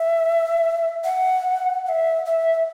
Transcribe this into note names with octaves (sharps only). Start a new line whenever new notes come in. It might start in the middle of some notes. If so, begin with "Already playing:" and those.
Already playing: E5
F#5
F#5
E5
E5